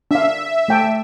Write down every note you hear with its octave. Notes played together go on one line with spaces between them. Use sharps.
D4 E5 F5
A3 G5 A5